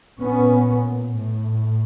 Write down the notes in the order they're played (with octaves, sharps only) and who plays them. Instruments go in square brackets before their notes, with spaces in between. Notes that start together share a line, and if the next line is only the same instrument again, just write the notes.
[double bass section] A#2 B3 C#4
A2